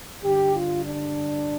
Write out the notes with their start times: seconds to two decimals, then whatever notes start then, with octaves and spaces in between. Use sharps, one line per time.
0.23 G2 D3 G3 G4
0.55 F4
0.86 D4